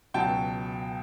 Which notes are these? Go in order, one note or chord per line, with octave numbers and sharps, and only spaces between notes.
C#2 B2 F#3 G5 A5